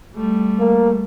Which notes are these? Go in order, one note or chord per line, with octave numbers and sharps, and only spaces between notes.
G3 A3
A#3